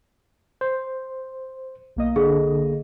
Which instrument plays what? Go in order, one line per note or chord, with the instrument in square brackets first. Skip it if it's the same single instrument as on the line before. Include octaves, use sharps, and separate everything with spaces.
[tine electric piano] C5
[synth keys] B1 A#3 D#5
[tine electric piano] D3 [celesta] G#4